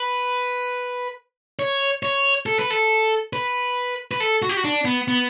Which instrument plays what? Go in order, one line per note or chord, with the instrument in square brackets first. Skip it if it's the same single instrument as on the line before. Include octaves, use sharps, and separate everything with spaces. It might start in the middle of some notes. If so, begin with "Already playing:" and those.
Already playing: [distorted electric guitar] B4
C#5
C#5
A4
B4
A4
B4
B4
A4
F#4
G4
F#4
D4
B3
B3